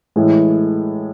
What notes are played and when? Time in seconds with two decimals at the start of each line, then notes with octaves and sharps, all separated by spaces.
0.16 A2 E3 G#3